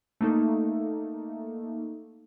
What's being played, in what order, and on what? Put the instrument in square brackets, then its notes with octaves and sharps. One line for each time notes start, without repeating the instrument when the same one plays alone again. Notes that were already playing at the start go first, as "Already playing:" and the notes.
[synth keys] A3 A#3 D#4 A4